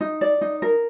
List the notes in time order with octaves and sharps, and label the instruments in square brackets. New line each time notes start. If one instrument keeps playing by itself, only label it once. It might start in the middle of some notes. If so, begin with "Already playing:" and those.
[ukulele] D#4
D5
D#4
A#4